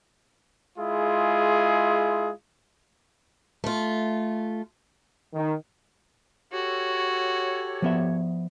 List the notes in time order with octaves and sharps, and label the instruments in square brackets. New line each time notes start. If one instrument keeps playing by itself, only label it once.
[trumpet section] G#3 E4 F4 G#4
[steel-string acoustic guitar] A3 F4
[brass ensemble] D#3
[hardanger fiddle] F#4 [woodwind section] G4 A4 C#5
[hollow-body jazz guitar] F3 B3 E5